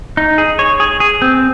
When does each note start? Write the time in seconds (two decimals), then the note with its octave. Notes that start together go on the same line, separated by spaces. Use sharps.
0.17 D#4
0.38 G#4
0.59 C#5
0.80 G#4
1.00 G#4
1.22 C4